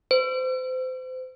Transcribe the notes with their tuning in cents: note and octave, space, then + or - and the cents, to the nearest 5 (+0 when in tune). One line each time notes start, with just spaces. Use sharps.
C5 -30